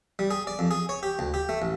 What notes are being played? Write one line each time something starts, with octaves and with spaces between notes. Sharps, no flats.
G3
G#4
D5
F2
G#4
C#5
G4
D2
G4
A3
A1